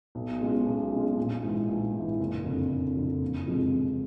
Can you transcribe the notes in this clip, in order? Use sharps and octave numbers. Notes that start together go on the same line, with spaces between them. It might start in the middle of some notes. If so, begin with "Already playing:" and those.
B1
B2 G#3 C#4 F4
B1
B2 G#3 C#4 F4
A#1
G#2 E3
A#1
G#2 E3
F#1
F2 D3
F#1
F2 D3
F#1
F2 C3 F3 G#3
F#1